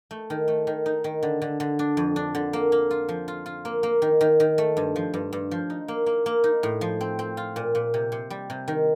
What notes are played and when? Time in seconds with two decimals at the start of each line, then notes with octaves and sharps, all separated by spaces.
0.11 A3
0.30 D#3
0.48 A3
0.67 D#3
0.86 D#4
1.04 D#3
1.23 D3
1.42 D3
1.60 D3
1.79 D4
1.97 F2
2.16 D4
2.35 D3
2.53 A#3
2.72 A#3
2.91 F4
3.09 F3
3.28 F4
3.46 F4
3.65 A#3
3.83 A#3
4.02 D#3
4.21 D#3
4.40 D#3
4.58 A3
4.77 G2
4.96 F3
5.14 G2
5.33 G2
5.51 F3
5.70 D#4
5.88 A#3
6.06 A#3
6.26 A#3
6.44 D#4
6.63 A2
6.81 F3
7.01 C4
7.19 C4
7.37 F4
7.56 A#2
7.75 A#2
7.94 C3
8.12 C3
8.30 G3
8.50 C3
8.68 D#3